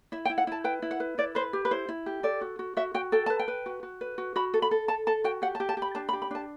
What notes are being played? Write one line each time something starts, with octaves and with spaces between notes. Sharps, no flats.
E4 E5
G5
E4
F#5
E4 A5
B4 G5
E4
F#5
B4
E4 D5
B4 C5
G4
B4
E4 C5
E4
G4
A4 D5
F#4
F#4
F#4 E5
F#4 G5
A4 G5
B4 A5
G5
B4
F#4
F#4
B4
F#4
F#4 B5
A4
B5
A4
A4 A5
A4 A5
F#4 G5
G4 F#5
A5
G4
A5
G4
B5
D4 A5
B5
G4
B5
D4 A5